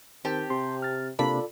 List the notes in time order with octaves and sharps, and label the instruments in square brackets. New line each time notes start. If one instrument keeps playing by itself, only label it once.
[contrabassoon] D#3 [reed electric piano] C4 A5 [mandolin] G4
[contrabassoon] C3 [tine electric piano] C6
[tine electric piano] F6 A6
[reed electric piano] C3 A#3 D4 [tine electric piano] F4 A4 D5 [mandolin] B5